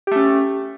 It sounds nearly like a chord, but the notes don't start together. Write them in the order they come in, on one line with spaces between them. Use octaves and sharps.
G4 A3 C#4